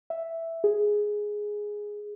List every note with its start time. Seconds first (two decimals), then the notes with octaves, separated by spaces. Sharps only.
0.10 E5
0.64 G#4